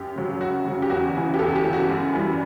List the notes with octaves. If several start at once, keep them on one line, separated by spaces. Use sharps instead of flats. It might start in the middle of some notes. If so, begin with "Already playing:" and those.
Already playing: F#2 G4
C#3 F#3
F#2 F#4
C#3 F#3
G4
E2 F#4
C#3 E3
G4
E2 A4
G4
C#3 E3
F#4
F#2
E3 G3